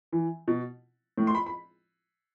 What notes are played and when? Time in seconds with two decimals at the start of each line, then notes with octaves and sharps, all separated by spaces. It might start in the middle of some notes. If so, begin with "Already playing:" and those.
0.12 E3
0.48 B2
1.18 A2
1.27 C6
1.35 B5
1.46 B5